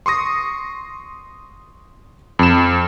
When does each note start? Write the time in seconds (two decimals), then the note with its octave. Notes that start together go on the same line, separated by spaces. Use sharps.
0.06 C6 C#6 D#6 A#6
2.39 F2 E7